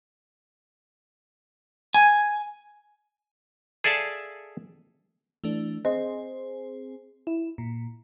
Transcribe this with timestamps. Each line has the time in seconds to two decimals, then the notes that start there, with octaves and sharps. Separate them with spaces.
1.94 G#5
3.84 G#4 A4 D5 E5 F5 A5
5.44 E3 A3 D4
5.85 C4 G#4 C5 D#5
7.27 E4
7.58 A#2